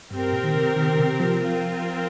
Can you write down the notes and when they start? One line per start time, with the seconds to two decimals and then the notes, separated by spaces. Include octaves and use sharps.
0.10 G2 C4 G4 A#4
0.32 A#2
0.44 D#3
0.55 C3
0.76 D#3
0.98 C3
1.20 F3
1.42 C4 F4 A#4